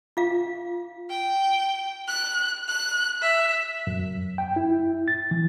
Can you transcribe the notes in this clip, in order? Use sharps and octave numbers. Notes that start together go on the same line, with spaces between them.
F4 F5
G5
F#6
F#6
E5
F#2
G5
E4
A6
E3